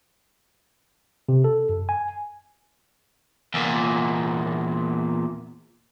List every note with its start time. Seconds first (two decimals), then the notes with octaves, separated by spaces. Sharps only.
1.29 C3
1.44 A4
1.69 F#2
1.89 G#5
3.54 E2 A#2